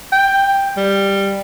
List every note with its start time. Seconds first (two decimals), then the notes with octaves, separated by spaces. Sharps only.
0.13 G5
0.77 G3